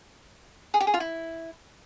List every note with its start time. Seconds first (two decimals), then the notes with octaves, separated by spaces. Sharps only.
0.74 G#4
0.80 G4
0.87 G#4
0.94 F4
1.00 E4